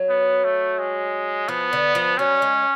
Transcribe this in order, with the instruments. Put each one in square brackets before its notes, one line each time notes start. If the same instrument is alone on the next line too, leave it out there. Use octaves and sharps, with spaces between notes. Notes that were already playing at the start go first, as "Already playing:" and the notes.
Already playing: [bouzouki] F#3
[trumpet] B3
A3
G#3
[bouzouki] F3 [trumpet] B3
[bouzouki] D3
F3
[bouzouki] F#3 [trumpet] C#4
[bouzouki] G#3